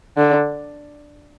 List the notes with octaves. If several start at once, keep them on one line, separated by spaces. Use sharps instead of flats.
D3